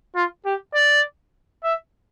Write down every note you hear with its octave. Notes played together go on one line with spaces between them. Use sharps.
F4
G4
D5
E5